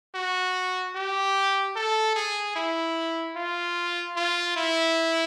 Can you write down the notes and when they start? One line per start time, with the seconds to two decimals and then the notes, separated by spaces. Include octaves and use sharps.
0.15 F#4
0.95 G4
1.76 A4
2.16 G#4
2.56 E4
3.36 F4
4.16 F4
4.56 E4